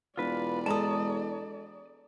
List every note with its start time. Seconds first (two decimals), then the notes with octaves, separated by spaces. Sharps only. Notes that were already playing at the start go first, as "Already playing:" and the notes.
0.17 E1 F4 B4 D5
0.66 G#3 A4 A5 A#5 D#6